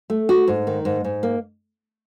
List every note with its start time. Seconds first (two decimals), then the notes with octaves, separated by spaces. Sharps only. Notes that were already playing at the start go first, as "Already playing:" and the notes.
0.10 A3
0.29 F#4
0.47 G#2
0.67 D#3
0.85 G#2
1.04 G#2
1.23 A#3